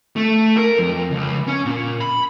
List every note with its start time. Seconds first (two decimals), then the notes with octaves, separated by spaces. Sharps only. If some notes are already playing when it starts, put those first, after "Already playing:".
0.16 A3
0.57 A#4
0.79 F2
1.11 C#2
1.47 C#4
1.66 A#2
2.01 B5